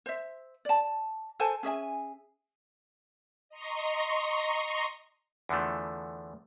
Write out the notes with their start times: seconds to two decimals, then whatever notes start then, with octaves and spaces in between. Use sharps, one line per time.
0.06 C5 E5
0.65 D5 A5
1.40 A4 C5 G#5 A5
1.63 C#4 G#4 E5 G#5
3.49 D#5 A#5 C6 C#6
5.49 E2 D3 E3 F3 A3